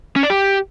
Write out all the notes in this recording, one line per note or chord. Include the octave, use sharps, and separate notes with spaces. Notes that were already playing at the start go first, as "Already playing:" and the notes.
C#4
D5
G4